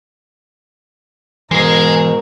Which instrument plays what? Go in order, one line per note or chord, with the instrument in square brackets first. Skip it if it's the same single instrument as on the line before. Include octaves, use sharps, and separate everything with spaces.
[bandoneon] G#2 B2 [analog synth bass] E3 [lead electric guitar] G#3 G#4 [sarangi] A#4